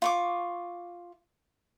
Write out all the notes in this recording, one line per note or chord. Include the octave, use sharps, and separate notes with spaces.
F4 C#6 D6